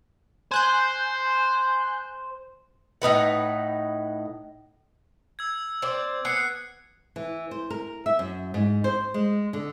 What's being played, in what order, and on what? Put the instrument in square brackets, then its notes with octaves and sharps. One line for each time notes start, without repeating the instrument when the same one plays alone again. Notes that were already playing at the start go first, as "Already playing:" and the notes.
[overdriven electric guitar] C5 [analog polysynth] G#5 F#6 G6
[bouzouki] A2 D#4 B4 F#5
[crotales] E6 G#6
[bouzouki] C4 C5 D5
[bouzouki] B3 [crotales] F#6 C7 C#7
[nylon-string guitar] E3
C5
A#4
E5
F#2
G#2
C5
G#3
D3